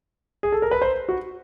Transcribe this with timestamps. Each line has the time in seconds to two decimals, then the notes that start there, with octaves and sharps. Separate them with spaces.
0.43 G#4
0.52 A4
0.62 A#4
0.71 B4
0.82 C5
1.09 F#4